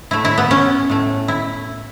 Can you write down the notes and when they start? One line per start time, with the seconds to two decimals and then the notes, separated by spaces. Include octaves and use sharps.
0.11 A2 A3 E4
0.25 E4
0.38 B3
0.51 C#4
0.90 A2 A3
1.28 E4